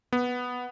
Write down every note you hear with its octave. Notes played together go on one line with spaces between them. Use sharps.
B3